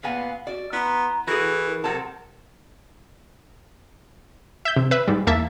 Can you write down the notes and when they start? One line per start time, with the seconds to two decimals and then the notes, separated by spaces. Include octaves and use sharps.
0.03 A#2 B3 F5 G#5
0.47 F#4 D5
0.73 B3 E4 A#5 C6
1.27 E3 E4 F#4 G#4 A4
1.68 A#4
1.84 C3 F#3 A4 F#5 A5
4.65 E5 G6
4.76 C3
4.91 B4 E5
5.08 G#2 G3
5.27 E2 A#3 E5 A5